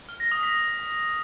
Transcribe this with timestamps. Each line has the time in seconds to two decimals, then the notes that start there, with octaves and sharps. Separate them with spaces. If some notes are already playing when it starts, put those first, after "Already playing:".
0.09 F6
0.20 A#6
0.32 D#6
0.43 B6